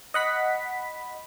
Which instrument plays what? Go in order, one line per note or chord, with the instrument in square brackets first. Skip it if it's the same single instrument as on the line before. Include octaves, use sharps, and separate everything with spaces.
[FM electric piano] D#5 F#5 B5 B6